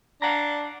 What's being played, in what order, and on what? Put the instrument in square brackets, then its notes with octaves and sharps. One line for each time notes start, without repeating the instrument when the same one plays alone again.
[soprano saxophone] D4 [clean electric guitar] F5 F#5 A#5